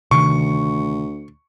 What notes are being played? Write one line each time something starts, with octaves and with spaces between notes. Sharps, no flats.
D2 C3 D#3 C#6